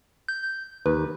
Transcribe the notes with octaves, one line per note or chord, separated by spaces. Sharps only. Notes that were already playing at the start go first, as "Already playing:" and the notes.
G6
D#2 B4